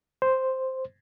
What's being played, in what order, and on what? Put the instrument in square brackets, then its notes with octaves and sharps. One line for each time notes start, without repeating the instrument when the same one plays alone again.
[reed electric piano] C5